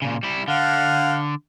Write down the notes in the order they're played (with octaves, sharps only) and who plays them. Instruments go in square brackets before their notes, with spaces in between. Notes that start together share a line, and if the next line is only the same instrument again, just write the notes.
[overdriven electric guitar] A#2 C#3
G3 E4
[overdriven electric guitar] D3 [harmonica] F5 F#5